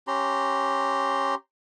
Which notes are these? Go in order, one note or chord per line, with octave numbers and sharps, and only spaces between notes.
C#4 G4 A#5 C6